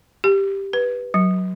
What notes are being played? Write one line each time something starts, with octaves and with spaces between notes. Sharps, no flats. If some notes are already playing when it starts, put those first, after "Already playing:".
G4
B4
F#3